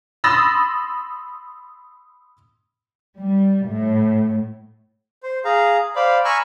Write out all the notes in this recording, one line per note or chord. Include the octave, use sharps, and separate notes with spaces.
B5 C6 D#6 E6 A6 A#6
G3
A2
C5
G#4 F5 A#5
C5 D5 F5 B5
G#5 A#5 B5 C#6 E6 F6